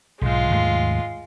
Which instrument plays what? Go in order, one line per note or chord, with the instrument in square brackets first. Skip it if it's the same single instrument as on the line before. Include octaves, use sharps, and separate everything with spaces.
[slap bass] B1 G#2 [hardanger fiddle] G#3 F4
[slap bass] D#2 G#2 A3